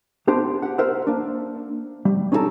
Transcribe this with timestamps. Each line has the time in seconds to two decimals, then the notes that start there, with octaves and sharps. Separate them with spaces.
0.27 B3 D4 G4 C5
0.62 G4 F#5
0.78 A#4 C5 E5 F#5
1.07 A#3 D4
2.05 G3
2.32 C#4 D#4 E4 G4 A4 A#5